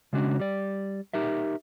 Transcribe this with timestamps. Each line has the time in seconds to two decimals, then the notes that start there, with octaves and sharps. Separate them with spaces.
0.13 C#3 G#3 C#4 D4 F#4
0.39 G3 D5
1.14 D#4 G4 A#4 E5